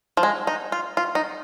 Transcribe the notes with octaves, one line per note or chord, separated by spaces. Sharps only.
F3
G#3
D#4
F4
F4
D#4